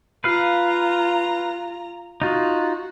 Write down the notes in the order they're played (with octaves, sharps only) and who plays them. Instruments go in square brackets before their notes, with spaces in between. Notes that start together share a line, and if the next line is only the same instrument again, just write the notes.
[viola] F4 A#5 [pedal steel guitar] B4 F5
[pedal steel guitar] D#4 F4 [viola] F#4